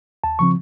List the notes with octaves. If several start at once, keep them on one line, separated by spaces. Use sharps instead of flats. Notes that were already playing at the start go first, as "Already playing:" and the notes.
D#2 A5
C#3 F3 C4 C#6